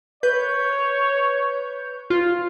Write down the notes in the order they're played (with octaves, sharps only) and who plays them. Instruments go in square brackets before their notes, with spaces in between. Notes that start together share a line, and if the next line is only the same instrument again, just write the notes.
[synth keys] B4 G6 [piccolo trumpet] C#5
[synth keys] F4